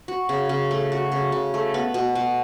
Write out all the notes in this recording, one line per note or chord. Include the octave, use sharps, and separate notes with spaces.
F#4
C#3
C#3
A3
F#4
C#3
C#3
A3
B3
B2
B2